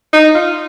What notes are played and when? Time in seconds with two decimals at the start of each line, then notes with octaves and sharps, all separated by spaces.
0.13 D#4
0.35 F4